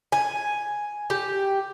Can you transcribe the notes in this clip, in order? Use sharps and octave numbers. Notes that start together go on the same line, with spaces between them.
G#5
G4